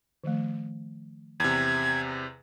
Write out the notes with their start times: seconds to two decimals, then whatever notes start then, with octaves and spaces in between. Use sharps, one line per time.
0.24 D#3 F3 A3
1.40 E2 C3 G#6